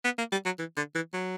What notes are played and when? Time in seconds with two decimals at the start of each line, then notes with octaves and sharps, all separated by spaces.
0.05 B3
0.18 A#3
0.32 G3
0.45 F#3
0.59 E3
0.77 D3
0.95 E3
1.13 F#3